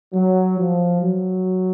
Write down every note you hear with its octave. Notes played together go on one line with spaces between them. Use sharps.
F#3
F3
F#3